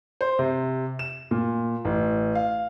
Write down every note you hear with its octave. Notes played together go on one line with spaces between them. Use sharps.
C5
C3
E7
A#2
A1
F5